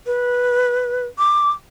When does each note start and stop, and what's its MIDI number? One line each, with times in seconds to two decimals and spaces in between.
0.06 1.05 71
1.18 1.52 86